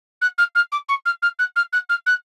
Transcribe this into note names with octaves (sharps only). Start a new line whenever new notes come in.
F#6
F6
F6
D6
C#6
F6
F6
F#6
F6
F#6
F6
F#6